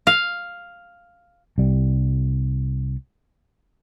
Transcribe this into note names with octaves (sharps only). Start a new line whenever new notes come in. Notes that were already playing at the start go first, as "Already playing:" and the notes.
F5
C2 G3